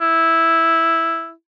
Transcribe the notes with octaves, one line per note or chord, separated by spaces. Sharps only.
E4